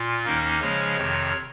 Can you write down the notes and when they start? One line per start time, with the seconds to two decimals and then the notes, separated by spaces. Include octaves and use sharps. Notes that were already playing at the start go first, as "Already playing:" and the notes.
Already playing: A#2 F4
0.25 D#2 D#3 A#3 C#4 D#4
0.61 C#3 F3 G#3 C#4 C#5
0.97 F2 C3 D#3